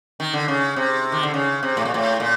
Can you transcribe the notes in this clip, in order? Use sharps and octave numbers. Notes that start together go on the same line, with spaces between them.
D#3
D3
C#3
C3
D#3
D3
C#3
C3
A2
A#2
A2
A#2